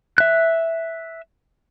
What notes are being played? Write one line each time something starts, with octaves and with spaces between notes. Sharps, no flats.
E5 F#6